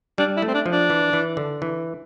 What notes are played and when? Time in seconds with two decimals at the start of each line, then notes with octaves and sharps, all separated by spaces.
0.18 G3 D4
0.37 E4
0.42 A3
0.48 C4
0.54 D4
0.66 F3
0.72 D4
0.90 E3
1.13 E3
1.37 D3
1.62 E3